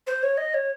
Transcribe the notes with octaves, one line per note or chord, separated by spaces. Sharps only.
C5
C#5
D#5
C#5